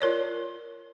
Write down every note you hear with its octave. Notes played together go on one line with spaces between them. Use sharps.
F4 A#4 C#5 D5